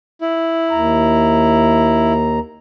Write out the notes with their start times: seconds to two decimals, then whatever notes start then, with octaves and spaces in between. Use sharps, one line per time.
0.21 E4
0.71 D#2 A#5